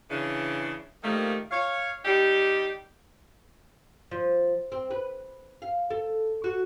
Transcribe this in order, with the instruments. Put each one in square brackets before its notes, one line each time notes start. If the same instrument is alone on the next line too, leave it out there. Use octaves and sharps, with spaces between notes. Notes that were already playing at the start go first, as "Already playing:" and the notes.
[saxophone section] C#3 E3 D4
D#3 F3 G3 A3 A#3
C#5 F5
G3 D#4 G4
[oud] F3
C4
B4
F5
A4
F#4